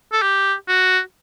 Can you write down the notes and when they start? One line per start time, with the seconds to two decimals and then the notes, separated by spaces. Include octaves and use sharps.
0.12 A4
0.22 G4
0.68 F#4